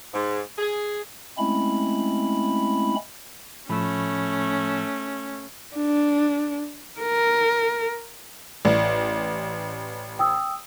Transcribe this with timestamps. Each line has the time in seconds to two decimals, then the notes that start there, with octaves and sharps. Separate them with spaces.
0.13 G#2
0.58 G#4
1.38 G#3 A3 C4 C#4 E4 B5
3.69 A2 F3 A3 C#4 B5
5.76 D4
7.00 A#4
8.65 A1 D5
10.19 G5 D#6 E6